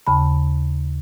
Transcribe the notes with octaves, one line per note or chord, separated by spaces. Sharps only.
D#2 C#3 A5 B5